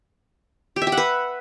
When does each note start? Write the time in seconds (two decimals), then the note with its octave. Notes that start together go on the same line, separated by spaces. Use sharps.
0.76 G4
0.82 E5
0.87 G4
0.92 F#5
0.98 B4